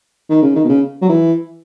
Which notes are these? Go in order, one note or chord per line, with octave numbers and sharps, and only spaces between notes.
D#3
C#3
D#3
B2
C#3
F#3
E3